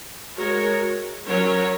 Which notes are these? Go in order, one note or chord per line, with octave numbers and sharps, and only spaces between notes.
G#3 F#4 A#4 C#5
F#3 C#4 A#4 C#5